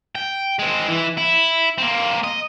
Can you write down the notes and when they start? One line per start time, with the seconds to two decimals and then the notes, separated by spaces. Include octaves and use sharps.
0.15 G5
0.59 G#3 C4
0.88 E3 E4
1.18 E4
1.78 A#3 C4
2.24 D#5